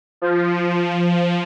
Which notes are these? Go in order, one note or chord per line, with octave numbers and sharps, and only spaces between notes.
F3
F3